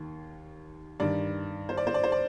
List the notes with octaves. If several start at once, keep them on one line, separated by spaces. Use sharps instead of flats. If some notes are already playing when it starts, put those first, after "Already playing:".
Already playing: D#2 D#3
G2 D#3 D5
C5
D5
C5
D5
C5
D5